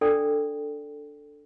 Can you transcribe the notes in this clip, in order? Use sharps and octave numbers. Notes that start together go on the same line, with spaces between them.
D4 A4 D5 G5 B5